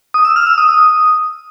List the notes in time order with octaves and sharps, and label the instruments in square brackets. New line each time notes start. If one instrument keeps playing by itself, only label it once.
[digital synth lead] D#6
E6
F6
E6
D#6